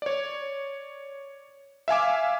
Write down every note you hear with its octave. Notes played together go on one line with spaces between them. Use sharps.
C#5 D5
E5 F5 G#5 D6